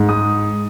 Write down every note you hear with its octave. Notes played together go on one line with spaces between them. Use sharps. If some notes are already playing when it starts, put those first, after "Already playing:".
Already playing: G#2
D#6